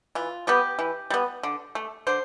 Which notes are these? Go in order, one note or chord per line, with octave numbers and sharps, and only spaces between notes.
E3 F4
G3 B3 G4
E3
G3 B3
D3
A3
D3 C5